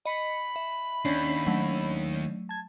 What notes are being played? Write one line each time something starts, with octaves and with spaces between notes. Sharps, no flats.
D#5 B5 C#7
E5
D#2 C#4 D4 C7
F#3 A3
A5 G#6